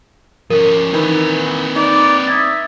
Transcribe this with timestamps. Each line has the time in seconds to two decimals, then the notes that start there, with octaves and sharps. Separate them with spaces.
0.50 F3 C#4 A#4
0.93 D#3 E3 C4 D#4 B4
1.76 D#4 D5
2.27 E5 D#6 G#6 A6